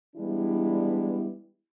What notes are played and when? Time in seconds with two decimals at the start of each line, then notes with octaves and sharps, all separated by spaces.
0.16 E3 G3 G#3 B3 D4 E4